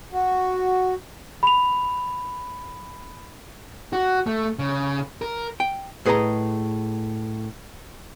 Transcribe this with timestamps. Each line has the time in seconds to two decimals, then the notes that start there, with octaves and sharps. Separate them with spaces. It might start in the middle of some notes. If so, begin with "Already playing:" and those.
0.13 F#4
1.43 B5 F7
3.93 F#4
4.27 A3
4.59 C#3
5.22 A#4
5.60 G5
6.06 A2 G#4 B4 C5 D#5 A#5